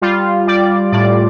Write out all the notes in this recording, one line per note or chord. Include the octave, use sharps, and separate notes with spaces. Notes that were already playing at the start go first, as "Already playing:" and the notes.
G3 F4
G3 D5
A2 D5